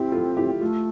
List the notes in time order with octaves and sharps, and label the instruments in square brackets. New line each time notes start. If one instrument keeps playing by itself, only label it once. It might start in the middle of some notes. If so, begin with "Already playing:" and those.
Already playing: [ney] C4 [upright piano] E4 G4
[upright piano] F4 A4
E4 G4
[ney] A3 [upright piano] F4